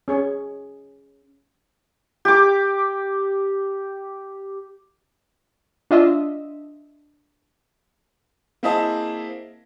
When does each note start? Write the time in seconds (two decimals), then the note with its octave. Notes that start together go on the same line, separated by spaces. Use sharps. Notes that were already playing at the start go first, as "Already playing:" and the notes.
0.08 C#4 G#4 C#5
2.25 G4 D6
5.91 D4 F4 D#5 E5
8.63 A#3 C4 E4 G#4 D#5 A5